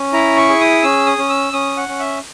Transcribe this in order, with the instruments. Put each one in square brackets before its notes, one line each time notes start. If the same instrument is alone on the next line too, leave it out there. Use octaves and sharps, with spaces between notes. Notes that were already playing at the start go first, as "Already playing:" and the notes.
Already playing: [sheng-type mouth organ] C#4
E4 A#5
C#6
G#4
D#6
C#4 E6
D#6
C#4
E6
C#4 D#6
F#5
C#4
E5